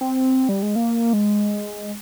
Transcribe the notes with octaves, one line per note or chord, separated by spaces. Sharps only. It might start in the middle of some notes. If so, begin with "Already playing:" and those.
C4
G3
G#3
A#3
G#3